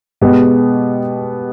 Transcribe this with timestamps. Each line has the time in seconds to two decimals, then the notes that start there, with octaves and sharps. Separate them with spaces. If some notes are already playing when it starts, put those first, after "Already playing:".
0.21 B2 G#3 B3 G4